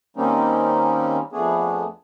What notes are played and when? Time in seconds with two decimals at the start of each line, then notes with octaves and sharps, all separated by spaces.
0.17 D#3 G3 A#3 C4 C#4 D#4
1.33 F2 A3 B3 D4 G#4